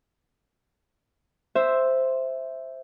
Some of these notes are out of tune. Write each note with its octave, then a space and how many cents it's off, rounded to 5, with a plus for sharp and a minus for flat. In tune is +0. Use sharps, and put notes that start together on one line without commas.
C5 +0 E5 +0